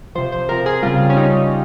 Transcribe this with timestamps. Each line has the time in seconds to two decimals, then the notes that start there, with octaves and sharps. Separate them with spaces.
0.15 C3 F3 C5
0.32 C5
0.49 C3 F3 A#4
0.66 G#4
0.83 C#3 G3 F4
1.10 C#4
1.17 C#3 G3 D#4